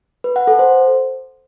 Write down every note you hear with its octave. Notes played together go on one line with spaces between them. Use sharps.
B4
F#5
A4
C5